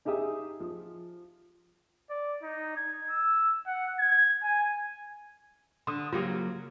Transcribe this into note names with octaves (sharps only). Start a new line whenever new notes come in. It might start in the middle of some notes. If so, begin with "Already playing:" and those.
D#4 G4 G#4 E5 D#6
F3
D5
D#4
G#6
E6
F#5
G#6
G#5
D3 C6 D#6
C#3 F#3 A#3 F4 G4